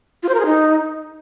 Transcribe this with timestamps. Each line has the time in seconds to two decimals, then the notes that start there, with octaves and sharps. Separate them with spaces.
0.23 F4
0.29 C5
0.34 A#4
0.40 G#4
0.46 D#4